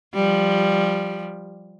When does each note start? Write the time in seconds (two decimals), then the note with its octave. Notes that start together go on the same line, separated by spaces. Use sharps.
0.15 F3 G3